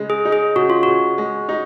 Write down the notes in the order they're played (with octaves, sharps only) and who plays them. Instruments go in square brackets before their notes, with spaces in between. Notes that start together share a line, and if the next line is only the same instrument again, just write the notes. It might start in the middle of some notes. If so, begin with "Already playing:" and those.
Already playing: [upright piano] C#3 G#3
[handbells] G#4
[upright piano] D#4
[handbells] G#4
[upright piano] C#3 [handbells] F#4
[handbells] F4
[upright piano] C#3 [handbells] F#4
[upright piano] G#3
D#4